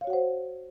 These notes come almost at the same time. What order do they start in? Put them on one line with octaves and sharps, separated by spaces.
F5 C#5 F#4 F#5 C5